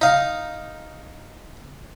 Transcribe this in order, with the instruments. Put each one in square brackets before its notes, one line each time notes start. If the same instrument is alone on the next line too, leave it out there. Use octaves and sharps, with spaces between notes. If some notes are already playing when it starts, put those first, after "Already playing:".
[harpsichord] D#4 F5